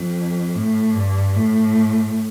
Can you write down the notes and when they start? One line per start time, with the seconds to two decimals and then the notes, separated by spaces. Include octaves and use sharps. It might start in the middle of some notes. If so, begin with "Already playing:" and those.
Already playing: F2
0.55 A2
0.95 G2
1.35 A2